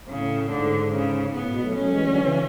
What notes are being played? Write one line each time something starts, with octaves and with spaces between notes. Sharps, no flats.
A2 C#3
G#2 D3
C#3
A2 B3
B2
F#3 A3
F#3 A3 C#4
E3 G#3
D3 F#3
C#3 E3